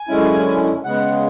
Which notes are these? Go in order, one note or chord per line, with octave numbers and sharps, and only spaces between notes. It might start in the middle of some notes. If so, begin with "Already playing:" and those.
Already playing: G#5
F#2 D3 G#3 C#4 E4
C#3 G#3 B3 F#5